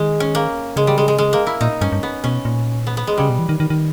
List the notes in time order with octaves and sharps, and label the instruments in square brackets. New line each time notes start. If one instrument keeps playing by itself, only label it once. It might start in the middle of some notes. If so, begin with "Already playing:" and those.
Already playing: [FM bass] D#3 [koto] G#3
[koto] C#4
A#3
[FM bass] C#3 [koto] G#3
[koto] G3
G#3
G#3
G#3
A#3
E4
[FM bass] A#2 [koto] D#4
[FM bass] G2 [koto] C#4
[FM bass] G2
[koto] B3
[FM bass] B2 [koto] C#4
[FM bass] A#2
[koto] B3
B3
G#3
[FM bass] C#3 [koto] G3
[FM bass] B2
E3
D#3
D#3
D#3